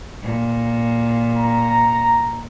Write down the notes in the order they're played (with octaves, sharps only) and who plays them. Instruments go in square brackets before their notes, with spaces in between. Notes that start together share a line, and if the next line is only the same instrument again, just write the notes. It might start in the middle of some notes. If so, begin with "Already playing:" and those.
[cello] A#2
[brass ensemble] A#5